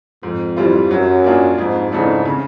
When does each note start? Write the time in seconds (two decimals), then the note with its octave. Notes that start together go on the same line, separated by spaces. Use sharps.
0.23 F2 G#2
0.57 E3 G3 C4 F4
0.90 F#2 F#3
1.24 A#3 D4 F4 G#4
1.58 F2 G#2
1.91 G#2 C#3 E3 A3 D4
2.25 C#3